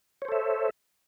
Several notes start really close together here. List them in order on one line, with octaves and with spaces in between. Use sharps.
C#5 C5 A4 E5